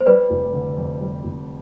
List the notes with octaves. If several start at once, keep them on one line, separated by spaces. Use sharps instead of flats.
C5
G3 B4 D5
F1
D3
F2
G3
F1